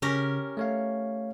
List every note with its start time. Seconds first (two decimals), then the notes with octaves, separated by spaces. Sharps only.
0.02 C#3 C#4 G4 A#4
0.57 A3 C#5 F5